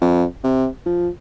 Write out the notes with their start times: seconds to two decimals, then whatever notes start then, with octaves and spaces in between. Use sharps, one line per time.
0.02 F2
0.44 C3
0.86 F3